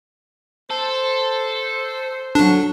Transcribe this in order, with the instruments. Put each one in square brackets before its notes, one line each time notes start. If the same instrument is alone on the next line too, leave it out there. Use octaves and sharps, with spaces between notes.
[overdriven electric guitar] A4 [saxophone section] C5
[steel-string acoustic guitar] F#3 A4 [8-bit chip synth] D4